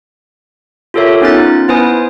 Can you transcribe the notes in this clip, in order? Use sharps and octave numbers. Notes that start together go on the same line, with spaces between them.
F4 G4 A4 A#4 C#5 E5
B3 C#4 D#4 F4 F#6 A6
B3 E4 B4 C5 G#5 D#6